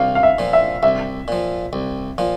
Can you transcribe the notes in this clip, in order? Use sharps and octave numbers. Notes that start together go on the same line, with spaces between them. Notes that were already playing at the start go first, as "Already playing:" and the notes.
Already playing: C2 F5
F5
E5
A#2 F3
E5
C2 E5
A#2 F3
C2
A#2 F3